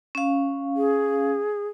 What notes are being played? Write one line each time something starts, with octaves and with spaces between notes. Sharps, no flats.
C#4 F5
G#4